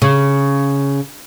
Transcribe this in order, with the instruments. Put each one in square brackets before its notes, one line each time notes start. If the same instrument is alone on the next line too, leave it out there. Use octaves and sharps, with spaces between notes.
[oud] C#3